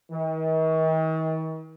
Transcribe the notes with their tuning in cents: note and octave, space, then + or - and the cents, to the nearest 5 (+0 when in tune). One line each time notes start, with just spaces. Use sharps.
D#3 +45